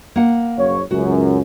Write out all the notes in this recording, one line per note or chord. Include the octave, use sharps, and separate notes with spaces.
A#3 F#5
F#1 C#5
C#2 F#2 F#4